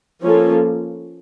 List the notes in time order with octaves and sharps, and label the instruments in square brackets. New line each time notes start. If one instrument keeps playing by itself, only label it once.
[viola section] F3 A#3 C#4 F4 A4